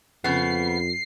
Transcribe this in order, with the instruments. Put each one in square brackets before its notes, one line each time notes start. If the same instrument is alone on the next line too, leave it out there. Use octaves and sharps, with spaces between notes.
[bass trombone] F2 [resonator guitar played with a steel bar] C#3 B3 [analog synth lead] C7